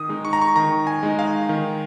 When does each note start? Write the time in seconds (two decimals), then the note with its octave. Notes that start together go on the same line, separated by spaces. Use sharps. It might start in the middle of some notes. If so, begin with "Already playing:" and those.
Already playing: D#3 D#6
0.09 G#3 D#4
0.25 C#6
0.33 A#5
0.41 C#6
0.56 D#3 A#5
0.87 G#5
1.03 G#3 D#4
1.19 F5
1.49 D#3